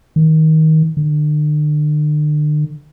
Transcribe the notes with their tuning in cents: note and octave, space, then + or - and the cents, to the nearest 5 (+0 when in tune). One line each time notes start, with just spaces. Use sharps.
D#3 +20
D3 +40